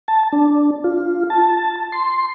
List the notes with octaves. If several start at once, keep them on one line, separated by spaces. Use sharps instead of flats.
A5
D4
F4
A5
C6